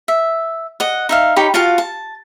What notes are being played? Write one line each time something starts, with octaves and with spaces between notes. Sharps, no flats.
E5
D#5 F#5
D#4 E5 F5
D#4 G4 C#5 B5
F4 F#4 F5 A5
A5